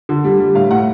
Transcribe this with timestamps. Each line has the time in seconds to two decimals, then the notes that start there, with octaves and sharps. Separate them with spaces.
0.09 D3
0.24 G3
0.39 G3
0.55 A2 F5
0.71 A2 F#5